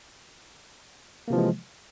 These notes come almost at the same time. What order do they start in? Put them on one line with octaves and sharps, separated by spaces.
A#3 C3 F3 E3 G#3